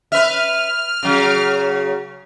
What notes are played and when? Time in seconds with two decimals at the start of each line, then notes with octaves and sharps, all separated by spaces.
0.12 B4 E5 F6
1.03 C#3 F#3